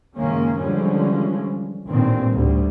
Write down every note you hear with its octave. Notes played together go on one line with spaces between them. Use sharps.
F#1 F#2 D#3 G#3 A#3 C#4
D3 E3 F3 G3 G#3 C#4
A1 G2 A#2 D#3 C4
D2 G#2 G3